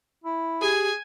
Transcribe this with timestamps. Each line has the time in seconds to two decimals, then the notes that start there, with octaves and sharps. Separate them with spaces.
0.24 E4
0.61 G4 G#4 G#5